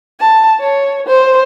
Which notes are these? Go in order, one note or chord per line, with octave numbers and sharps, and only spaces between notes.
A5
C#5
C5